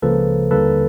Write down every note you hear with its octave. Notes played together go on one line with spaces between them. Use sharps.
C#2 C#3 F3 A#3 A4 B4
D#2 D3 G3 A#3 A4 B4